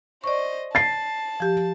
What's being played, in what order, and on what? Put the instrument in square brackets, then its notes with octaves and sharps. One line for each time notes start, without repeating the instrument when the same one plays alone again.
[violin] C5 D#5 [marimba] D5 C#6
[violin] A5 [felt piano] A6 C7
[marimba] F3 G4